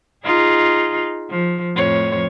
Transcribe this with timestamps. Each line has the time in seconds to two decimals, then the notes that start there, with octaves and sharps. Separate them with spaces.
0.24 D#4 F4 G#4
1.30 F3
1.75 F2 A2 C#5